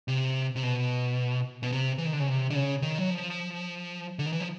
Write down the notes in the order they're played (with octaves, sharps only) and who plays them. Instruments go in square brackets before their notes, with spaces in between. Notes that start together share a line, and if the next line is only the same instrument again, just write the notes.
[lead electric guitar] C3
C3
B2
B2
C3
E3
D#3
D3
C#3
C3
D3
C#3
D#3
F#3
F3
D3
D#3
E3
F3